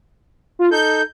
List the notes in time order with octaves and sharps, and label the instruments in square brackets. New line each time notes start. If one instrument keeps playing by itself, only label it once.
[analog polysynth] F4
[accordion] D#4 A4 [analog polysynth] G6